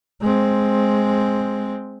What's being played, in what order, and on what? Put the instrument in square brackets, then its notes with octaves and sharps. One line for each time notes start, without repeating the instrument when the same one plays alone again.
[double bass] G#3 C4